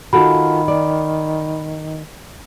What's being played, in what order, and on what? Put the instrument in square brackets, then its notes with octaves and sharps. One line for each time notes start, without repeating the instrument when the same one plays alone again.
[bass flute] D#3 [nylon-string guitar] F4 F#4 A4 [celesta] B5
[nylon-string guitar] D5